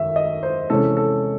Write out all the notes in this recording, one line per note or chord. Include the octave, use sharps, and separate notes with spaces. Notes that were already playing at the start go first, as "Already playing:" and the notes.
Already playing: F#2 D#3 E5
D#5
C5
C3 E3 G#3 C#4 A4
A4